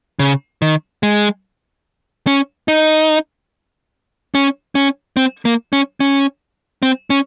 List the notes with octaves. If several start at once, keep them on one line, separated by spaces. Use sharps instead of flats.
C#3
D#3
G#3
C#4
D#4
C#4
C#4
C4
A#3
C#4
C#4
C4
C#4